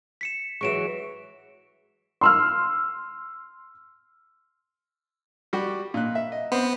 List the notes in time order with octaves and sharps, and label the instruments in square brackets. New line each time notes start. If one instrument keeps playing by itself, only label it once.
[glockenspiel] B6 C#7 E7
[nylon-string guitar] E3 F#3 G#3 [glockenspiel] C#6 D7 E7
[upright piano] C6 E6 F6
[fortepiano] G3 F#4 G4
A#2 F#6
E5
D#5
[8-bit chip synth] B3 [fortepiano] C4 C5